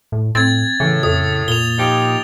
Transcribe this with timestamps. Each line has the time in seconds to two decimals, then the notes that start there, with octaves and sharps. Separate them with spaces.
0.12 A2
0.35 A2 C4 G#6 A6
0.80 A2 C#3 E3
1.03 F2 D#6
1.48 A#2 F7 G7
1.78 F3 D#4 G4